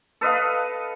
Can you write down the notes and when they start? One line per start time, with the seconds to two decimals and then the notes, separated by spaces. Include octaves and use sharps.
0.21 A4 B4 D#5 F5